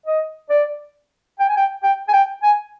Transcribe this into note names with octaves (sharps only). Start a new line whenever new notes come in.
D#5
D5
G5
G#5
G5
G5
G#5
G5
G#5